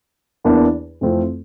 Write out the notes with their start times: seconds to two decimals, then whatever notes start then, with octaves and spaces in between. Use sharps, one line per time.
0.44 E2 E3 A#3 D4
1.01 F2 E3 A3 C4 F4